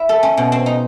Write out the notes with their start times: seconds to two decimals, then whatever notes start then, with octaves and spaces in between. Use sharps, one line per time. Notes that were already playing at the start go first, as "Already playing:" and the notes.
Already playing: E4
0.09 A4
0.23 C#4
0.37 B2
0.52 C4
0.66 D#4